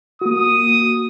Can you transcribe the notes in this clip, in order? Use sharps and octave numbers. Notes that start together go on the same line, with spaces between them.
A#3 F#4 D#6